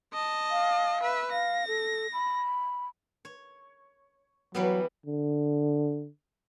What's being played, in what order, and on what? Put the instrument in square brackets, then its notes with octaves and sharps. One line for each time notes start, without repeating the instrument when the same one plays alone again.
[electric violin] D#5 A5
[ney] F5
[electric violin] B4 E5
[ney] F5 [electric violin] A#6
[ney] A4
B5
[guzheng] C#5
[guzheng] E3 G3 B3 [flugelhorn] F#3
[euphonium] D3